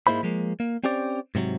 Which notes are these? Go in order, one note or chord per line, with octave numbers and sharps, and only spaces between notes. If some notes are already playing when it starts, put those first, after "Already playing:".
G#2 G#3 A#3 E4 C5 B5
F3 G#3 A#3
A#3
C4 C#4 G4 C5 D5
G#2 C3 E3 F#3